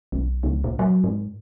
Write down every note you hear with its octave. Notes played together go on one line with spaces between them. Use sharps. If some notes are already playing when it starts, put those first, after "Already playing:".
B1
C#2
A#2
F#3
G#2